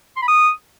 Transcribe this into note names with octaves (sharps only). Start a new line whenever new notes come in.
C6
B5
D#6